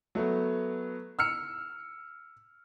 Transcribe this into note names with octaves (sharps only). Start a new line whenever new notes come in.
F#3 A3 B3
E6 F6 C#7